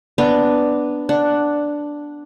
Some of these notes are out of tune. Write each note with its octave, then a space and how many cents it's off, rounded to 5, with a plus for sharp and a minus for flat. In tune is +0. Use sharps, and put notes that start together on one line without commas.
B3 +0 D4 +0 A#5 -5
D4 +0 F#5 +0